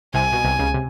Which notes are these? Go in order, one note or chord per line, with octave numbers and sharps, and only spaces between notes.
C2 C3 G#5
B2
C2 C3
C#2 C#3
C3